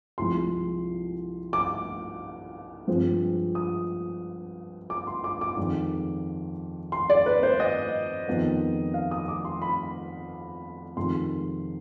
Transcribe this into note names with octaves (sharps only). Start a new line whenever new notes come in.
C2 C3 F3 G#3 C6
D6
G2 F3 G#3 C4
D#6
D6
C6
D6
D6
F2 D#3 G#3
C6
D5
B4
C5
D#5
F2 D#3 G#3 B3
F5
D#6
D6
C6
B5
F2 C3 D#3 G#3 C6